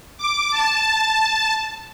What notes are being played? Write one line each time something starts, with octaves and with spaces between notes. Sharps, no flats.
D6
A5